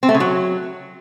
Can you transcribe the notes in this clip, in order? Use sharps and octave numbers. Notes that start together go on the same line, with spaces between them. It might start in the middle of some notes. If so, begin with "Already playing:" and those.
C4
A3
C#3
F#3